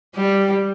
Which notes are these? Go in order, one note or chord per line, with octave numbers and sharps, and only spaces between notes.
G3